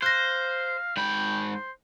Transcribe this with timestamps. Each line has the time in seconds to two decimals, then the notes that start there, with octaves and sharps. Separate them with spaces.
0.02 C5 F5 F#6 A#6
0.97 G#2 G5 B5
1.53 C5